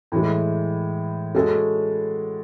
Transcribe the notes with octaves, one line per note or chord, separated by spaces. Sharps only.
A2 E3 G#3
G#3 C#4 F#4 A4